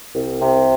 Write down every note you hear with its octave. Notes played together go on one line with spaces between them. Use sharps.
C2
C3